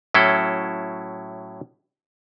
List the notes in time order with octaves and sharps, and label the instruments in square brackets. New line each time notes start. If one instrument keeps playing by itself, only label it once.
[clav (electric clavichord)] A2 F#3 C#4 E4 A4